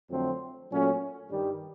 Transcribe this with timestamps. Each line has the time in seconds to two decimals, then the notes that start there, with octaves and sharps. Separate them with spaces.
0.09 F2 D3 F#3 A3 C4
0.70 A#2 F#3 A3 C#4 F#4
1.29 G2 D#3 G3